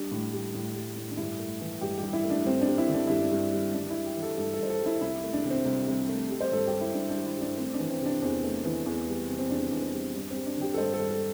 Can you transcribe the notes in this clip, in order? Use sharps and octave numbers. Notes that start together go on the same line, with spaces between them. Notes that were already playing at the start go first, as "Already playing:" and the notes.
Already playing: G3 D4
A2
G3
A2
G3
A2
D4
G2 E4
A3
E3
G2 G4
G2 G4
E4
A3
D4
G2 C4
D4
G3
E4
D3
D4
G2 E4
D4
G2
G3
G2 D4
E4
G3
G4
E3
A4
G2 A4
A4
G2 C5
A4
G3
E4
C2 E4
A3
D4
C3
C4
C2
C2
A3
G3
C5
G2 A4
G4
G3
E4
G2 D4
D4
G3
E4
G2 D4
A3 C4
D4
E3
C4
C3 D4
E2 C4
A3
E3
E2
G3
C3
C4
E2 D4
E2 D4
C4
G3
G2 D4
C4
G3
D4
D3 G4
A4
G2 C5
A4
G2
A4